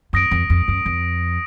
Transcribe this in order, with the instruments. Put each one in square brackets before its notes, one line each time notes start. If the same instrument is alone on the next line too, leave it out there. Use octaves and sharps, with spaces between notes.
[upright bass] F#2 [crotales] D#6 A#6 D7
[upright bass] F2
F2
F#2
F2